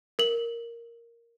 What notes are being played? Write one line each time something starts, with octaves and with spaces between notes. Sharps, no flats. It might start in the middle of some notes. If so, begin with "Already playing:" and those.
A#4 F#7